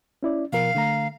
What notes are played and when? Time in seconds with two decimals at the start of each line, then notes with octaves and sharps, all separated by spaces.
0.23 C#4 E4 D5
0.53 B2 F3 A#4 F5
0.75 D3 A3 A#5